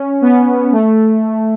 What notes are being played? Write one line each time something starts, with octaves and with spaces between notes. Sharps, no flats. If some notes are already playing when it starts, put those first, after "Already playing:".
Already playing: C#4
B3
A3